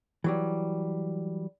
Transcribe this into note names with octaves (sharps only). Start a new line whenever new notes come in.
E3 F#3 G3